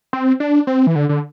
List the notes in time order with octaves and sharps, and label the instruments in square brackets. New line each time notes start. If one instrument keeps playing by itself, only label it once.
[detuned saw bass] C4
D4
C4
E3
D3
D3